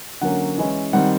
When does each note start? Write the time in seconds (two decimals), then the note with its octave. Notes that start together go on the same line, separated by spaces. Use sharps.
0.21 D3 F#3 A#3 C#4 F#5
0.58 E3 G#3 C#4 E4
0.93 D#3 G3 C4 F#5